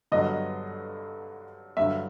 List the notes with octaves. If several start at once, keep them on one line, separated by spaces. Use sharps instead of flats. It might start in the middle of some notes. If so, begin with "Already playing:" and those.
G2 D3 F#3 B3 D#5
G2 D3 F#3 E5